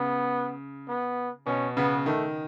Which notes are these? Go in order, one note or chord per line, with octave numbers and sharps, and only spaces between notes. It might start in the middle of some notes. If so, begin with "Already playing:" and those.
Already playing: C#3 B3
B3
B2 C#4
C#3 B3
D#3 A3